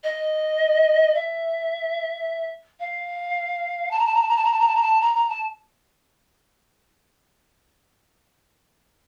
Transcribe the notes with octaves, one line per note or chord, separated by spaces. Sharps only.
D#5
E5
F5
A5
A#5
A5
A#5
A5
A#5
A5
A#5
A5
A#5
A5
A#5
A5
A#5
A#5
A5